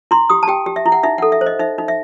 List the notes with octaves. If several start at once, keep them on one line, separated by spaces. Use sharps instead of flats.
E4 C6
G4 D#6
A5
G4 G5
G4
E5
E4
F#5
D#4 E5
A4 F#5
E5
C5
D#5
D#4 E5
D#4
E5